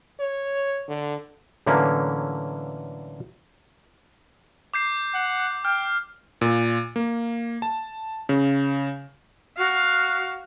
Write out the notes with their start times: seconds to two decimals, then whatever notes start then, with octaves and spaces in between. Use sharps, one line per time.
0.20 C#5
0.88 D3
1.66 A2 D3 E3 F#3 A#3 C#4
4.74 D6 G6 C7
5.14 F#5
5.65 G5 F6
6.41 A#2
6.96 A#3
7.62 A5
8.29 C#3
9.57 F#4 F5